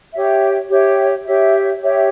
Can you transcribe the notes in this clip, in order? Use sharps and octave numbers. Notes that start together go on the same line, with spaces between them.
G4 C#5 E5
G4 C#5 E5
G4 C#5 E5
G4 C#5 E5